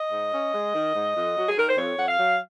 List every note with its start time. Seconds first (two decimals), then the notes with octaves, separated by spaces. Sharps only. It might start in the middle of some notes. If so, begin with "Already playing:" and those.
Already playing: D#5
0.12 G#2
0.33 C#4
0.53 G#3
0.74 D#3
0.95 G#2
1.16 F2
1.37 F#3 F#4
1.49 G#4
1.57 D#3 A#4
1.68 C5
1.77 F2 C#5
1.97 F2 F#5
2.08 F5
2.18 F#3